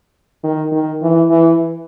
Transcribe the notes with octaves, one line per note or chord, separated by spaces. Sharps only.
D#3
D#3
E3
E3